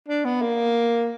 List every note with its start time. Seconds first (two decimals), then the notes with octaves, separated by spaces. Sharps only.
0.08 D4
0.25 B3
0.41 A#3